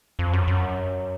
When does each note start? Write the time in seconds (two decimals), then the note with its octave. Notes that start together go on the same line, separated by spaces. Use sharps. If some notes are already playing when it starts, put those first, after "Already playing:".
0.19 F2
0.33 F#2
0.47 F#2